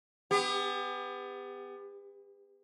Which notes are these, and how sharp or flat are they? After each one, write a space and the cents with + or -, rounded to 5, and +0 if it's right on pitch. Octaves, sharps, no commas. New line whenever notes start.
B3 +25 G4 +40